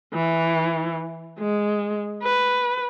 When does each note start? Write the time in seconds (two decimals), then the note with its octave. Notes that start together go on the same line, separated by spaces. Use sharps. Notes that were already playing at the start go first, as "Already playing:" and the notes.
0.14 E3
1.39 G#3
2.23 B4